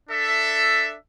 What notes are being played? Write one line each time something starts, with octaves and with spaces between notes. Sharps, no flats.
D4 A4 E5